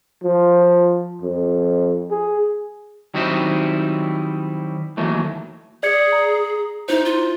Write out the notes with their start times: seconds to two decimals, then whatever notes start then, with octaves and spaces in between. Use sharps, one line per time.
0.23 F3
1.22 F2
2.10 G#4
3.14 D#3 F#3 G3 C4 D#4 E4
4.97 D#2 E3 F#3 A3
5.83 G#4 D5 G#6 C#7
6.12 A#5
6.89 D#4 E4 C5
7.05 F4